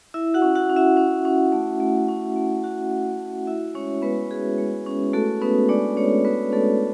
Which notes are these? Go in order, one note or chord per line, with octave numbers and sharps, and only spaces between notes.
E4 E5
F#4 F#5
C#4
F#4 F#5
C#4
E4 E5
C#4
C#4
A3
A3
C#4
A3
C#4 F#4 F#5
E4
A3
E4 F#4 E5
G#3 C#4 C#5
G#3 B3 B4
F#4 G#4
G#3
C#4
A3 F#4 A4
B3 C#4 B4
G#3 D4 D5
G#3 C#4 C#5
B3 F#4 B4
A3 C#4 A4